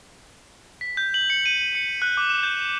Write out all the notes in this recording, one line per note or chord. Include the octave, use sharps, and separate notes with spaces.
B6
G6
F#7
C#7
D#7
D#7
C#7
F#6
D6
E7
G6